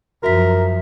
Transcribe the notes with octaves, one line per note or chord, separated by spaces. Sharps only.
F#2 F3 F#4 A#4 E5 B6